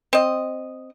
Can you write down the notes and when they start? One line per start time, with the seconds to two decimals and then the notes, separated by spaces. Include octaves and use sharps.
0.13 C4 D#5